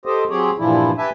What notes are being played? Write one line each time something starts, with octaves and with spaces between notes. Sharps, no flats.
G4 A4 C5 D#5
F#3 C4 G4 G#4 C#5
G2 A#2 E3 F3 D4 E4
G4 B4 E5 G#5 A5